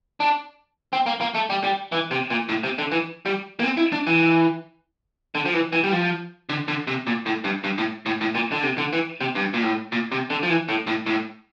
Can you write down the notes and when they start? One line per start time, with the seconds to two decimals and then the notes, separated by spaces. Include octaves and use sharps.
0.20 D4
0.93 C4
1.06 A#3
1.21 A#3
1.35 A3
1.50 G3
1.64 G3
1.92 E3
2.11 C3
2.30 A#2
2.49 A2
2.64 C3
2.78 D3
2.92 E3
3.26 G3
3.60 A#3
3.63 C4
3.77 E4
3.92 D4
4.07 E3
5.35 D3
5.46 F3
5.54 E3
5.72 E3
5.84 G3
5.92 F3
6.49 D3
6.68 D3
6.87 C3
7.07 A#2
7.26 A2
7.44 G2
7.64 G2
7.78 A2
8.06 A2
8.21 A2
8.35 A#2
8.52 D3
8.63 C3
8.78 D3
8.93 E3
9.21 C3
9.35 G2
9.54 A#2
9.63 A2
9.92 A#2
10.12 C3
10.30 D3
10.43 F3
10.50 E3
10.69 A2
10.87 A2
11.06 A2